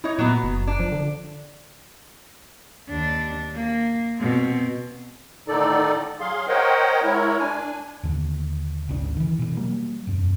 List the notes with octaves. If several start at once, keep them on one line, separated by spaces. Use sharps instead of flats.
D#4 E4 C#5
A#2 F#3 B3
F#1
D4
F3
D3
D#2 D4
A#3
B2 C4
A2 D3 D#3 D#4 A4 D5
F#3 G#4 F5 C6
A#4 C5 C#5 D#5 F#5 G5
G#3 E4 A#4 C#5
D4 G#5
D#2 D3
G#1 D2 C#3 D4
D#3 E3
B2 E3
F#3 G3 A#3
E1 F#2